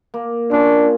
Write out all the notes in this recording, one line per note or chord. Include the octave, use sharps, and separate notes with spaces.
A#3
A#2 C#4 D4